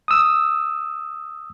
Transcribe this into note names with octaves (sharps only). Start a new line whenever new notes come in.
D#6 E6